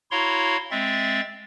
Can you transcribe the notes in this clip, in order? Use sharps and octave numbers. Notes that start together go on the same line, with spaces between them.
E4 F#4 C#5 F5 A#5 C6
G#3 C4 E5 A6